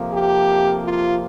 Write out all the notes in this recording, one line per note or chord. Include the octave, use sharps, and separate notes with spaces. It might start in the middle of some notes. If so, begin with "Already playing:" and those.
Already playing: F2 C3 F3 A#3
G4
F4